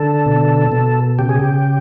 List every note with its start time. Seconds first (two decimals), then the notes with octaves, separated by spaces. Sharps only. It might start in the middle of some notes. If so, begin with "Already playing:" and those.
Already playing: D3 A4
0.26 B2
0.72 B2
1.19 C#3 G4
1.29 G#4
1.39 G4